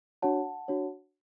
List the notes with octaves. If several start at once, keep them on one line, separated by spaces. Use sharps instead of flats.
D4 F#4 C#5 F#5 A5
D4 F#4 C#5